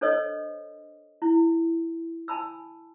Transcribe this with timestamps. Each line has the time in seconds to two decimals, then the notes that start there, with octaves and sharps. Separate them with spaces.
0.01 D4 A4 C5 C#5 D#5 E6
1.22 E4
2.28 G#5 A5 B5 E6